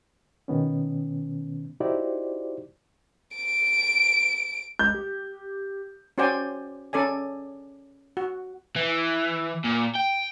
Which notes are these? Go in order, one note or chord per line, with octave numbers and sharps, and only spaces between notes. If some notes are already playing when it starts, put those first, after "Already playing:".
B2 D#3 B3 C#4
D#4 E4 F#4 G4 C5 D5
D7
G#3 G6
G4
C#4 F#4 C5 D5 G5 G#5
C#4 A4 D5 G#5
F#4
E3
A#2
G5